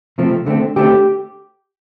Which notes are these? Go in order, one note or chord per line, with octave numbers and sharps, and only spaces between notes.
C3 F3 A3 C4
D3 A3 C4
D3 A3 C4 G4